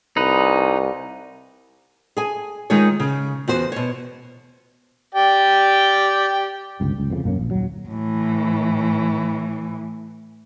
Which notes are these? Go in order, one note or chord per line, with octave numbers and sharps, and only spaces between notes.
C2 D#4 B4
G#4 G#5
D#3 G#3 D#4 F4 G#4 C#5
C#3
E2 F#4 C5
B2 C#5
G4 D5 G5
G1 C#2 G2
C#2
F2 A#2 C#3
B1 F#2 A#3 C#4
A#1
D#1 F#3
A2 E3